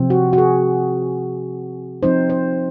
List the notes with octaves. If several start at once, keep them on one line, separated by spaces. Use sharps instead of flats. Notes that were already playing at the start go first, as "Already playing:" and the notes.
Already playing: C3 F3 C4
F#4
F#4
G#4
F3 C4 D#4 C5
C5